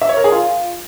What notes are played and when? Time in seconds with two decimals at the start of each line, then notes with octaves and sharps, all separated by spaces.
0.02 E5
0.09 C#5
0.17 A#4
0.24 G#4
0.32 F4